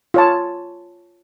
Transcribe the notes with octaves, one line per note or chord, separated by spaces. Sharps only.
F4 C#5 A5